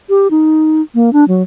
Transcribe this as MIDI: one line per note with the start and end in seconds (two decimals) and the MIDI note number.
0.09 0.28 67
0.31 0.82 63
0.95 1.12 58
1.13 1.25 62
1.28 1.42 54